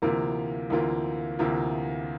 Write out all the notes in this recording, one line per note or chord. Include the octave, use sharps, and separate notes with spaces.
D2 C3 E3 A#3 F4
D2 C3 E3 A#3 F4
D2 C3 E3 A#3 F4